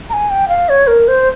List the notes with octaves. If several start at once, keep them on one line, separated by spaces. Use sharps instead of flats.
A#5
G#5
G5
F5
C#5
A#4
C5